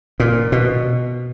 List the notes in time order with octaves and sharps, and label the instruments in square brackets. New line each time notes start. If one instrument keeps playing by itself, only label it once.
[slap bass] A#2
B2